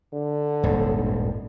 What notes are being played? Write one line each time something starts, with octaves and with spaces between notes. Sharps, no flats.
D3
D#1 G#1 G2